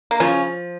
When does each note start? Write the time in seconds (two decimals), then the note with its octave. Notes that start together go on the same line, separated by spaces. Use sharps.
0.11 A#3
0.20 C#3 F3 C#4